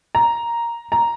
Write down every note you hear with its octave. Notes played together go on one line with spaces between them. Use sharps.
A#5
A#5